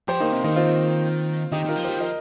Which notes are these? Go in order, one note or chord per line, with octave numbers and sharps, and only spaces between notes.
F3 G4 C5
D#3 A#3 D#4
C3
D#3 A#3 D#4
C4 F4
D#3 D#4 G4
D#3 F4 A#4
F3
G3 G4 C5
F3 A#4 D#5